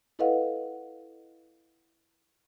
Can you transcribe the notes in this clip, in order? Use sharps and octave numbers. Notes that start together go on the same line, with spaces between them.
E4 A4 B4 D#5 F5 F#5